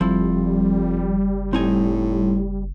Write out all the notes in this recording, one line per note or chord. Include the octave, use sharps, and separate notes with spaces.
F#1 F2 F3 G3 E4
A2 C4 D#4 G#5